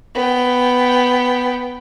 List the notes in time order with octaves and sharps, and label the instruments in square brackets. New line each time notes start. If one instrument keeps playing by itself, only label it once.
[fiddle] B3 G5